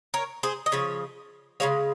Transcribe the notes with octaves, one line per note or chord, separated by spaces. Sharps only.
A#4 C#5
G#4 C5
D#5
C#3 F3 C#5
C#3 F3 G#3 C#5 F5